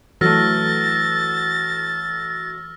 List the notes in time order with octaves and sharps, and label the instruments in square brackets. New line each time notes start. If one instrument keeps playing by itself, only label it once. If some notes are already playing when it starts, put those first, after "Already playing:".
[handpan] E3 A4 [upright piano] F#3 A3 [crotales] E6 F6 A#6 [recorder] A6